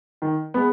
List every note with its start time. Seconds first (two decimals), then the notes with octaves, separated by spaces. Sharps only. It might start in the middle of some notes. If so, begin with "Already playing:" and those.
0.22 D#3
0.54 G#3 B3